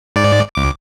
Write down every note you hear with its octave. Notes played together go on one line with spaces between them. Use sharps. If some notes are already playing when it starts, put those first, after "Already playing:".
G#2 D5
C#2 D6